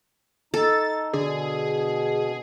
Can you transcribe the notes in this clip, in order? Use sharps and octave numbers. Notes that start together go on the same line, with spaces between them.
D#4 A4 A6
B2 D3 G#4